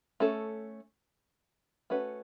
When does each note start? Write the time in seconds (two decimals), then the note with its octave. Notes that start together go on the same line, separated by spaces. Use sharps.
0.20 A3 C#4 A4
1.90 A3 C#4 F#4 B4